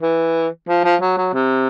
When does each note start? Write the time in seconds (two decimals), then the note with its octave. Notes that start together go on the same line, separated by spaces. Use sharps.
0.02 E3
0.68 F3
0.84 F3
1.01 F#3
1.17 F#3
1.33 C3